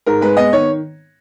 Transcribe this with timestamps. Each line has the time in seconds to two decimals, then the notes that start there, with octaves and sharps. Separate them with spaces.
0.06 G#2 A#4
0.21 G#3 B4
0.37 B3 D#5
0.53 D#3 C#5